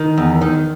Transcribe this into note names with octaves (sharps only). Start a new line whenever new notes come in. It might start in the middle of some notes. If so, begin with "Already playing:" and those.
Already playing: D#3
E2
D#3